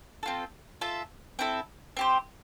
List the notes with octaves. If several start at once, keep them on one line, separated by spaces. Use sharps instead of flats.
C4 F4 A4
F4 A4 E5
C4 E4 A4
C4 G4 C5